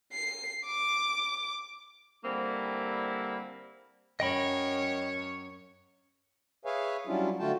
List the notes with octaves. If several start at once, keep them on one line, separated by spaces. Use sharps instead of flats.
C7
D6
D3 G3 A#3 C4 E4
F#2 C#5 D#5 G5 B5
G#4 B4 C#5 E5 F5 G#5
F#3 G3 C#4 D4 E4 F4
D3 A3 F4 F#4 G5 A5